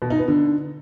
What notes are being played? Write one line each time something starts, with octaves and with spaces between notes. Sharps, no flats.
B2
D#4
B3
D3